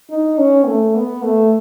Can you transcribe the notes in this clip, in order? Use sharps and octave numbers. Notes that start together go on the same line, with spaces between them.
D#4
C#4
A3
B3
A3